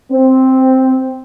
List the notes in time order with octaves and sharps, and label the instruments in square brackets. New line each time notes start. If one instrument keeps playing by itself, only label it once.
[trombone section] C4